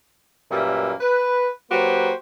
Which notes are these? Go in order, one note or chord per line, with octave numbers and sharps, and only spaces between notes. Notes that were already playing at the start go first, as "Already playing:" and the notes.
F#2 A#2 G3 A#3 B4 E5
B4
F#3 A#3 F#4 G4 B4 C5